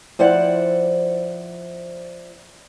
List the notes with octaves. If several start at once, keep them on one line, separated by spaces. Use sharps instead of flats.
F3 E4 C5 D5 F#5